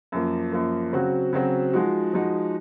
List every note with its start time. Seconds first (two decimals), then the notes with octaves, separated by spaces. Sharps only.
0.12 F#2 F3 A#3
0.52 F#2 F3 A#3
0.92 C#3 F#3 C4 F#4
1.33 C#3 F#3 C4 F#4
1.73 F3 G#3 D#4 F#4
2.13 F3 G#3 D#4 F#4